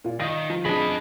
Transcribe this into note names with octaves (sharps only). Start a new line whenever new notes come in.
A#2 F4
D#3 F5 D#6 A#6
F3
F#1 D4 G#4 D#5 B5 A#6